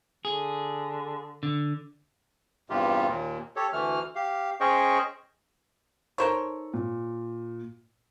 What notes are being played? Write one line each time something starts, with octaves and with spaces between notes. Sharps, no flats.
D3 G#4
D3
E2 G2 C3 F4 G4
D#2 A#2
G4 A4 C#5
D2 E3 A3 F6
G4 F5
C#4 G#4 C5 D#5 G5 C#6
D#4 A4 A#4 C5 C#5
A#2